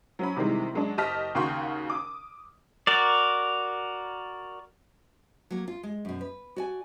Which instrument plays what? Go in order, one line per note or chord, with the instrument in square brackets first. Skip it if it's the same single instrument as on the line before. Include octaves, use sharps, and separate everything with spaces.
[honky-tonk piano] F#3 C#4 B5
C3 D#3 E3 G3 G#3
F#3 G#3 D4
F#1 G4 D#5 A5 F6 B6
D#2 C#3 F#4 G5 C6 C#6
D6 D#6
[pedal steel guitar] F#4 A#4 D5
[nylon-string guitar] F#3 A#3
F4
G#3
F#2 B2
B4
F#4 D5 G#5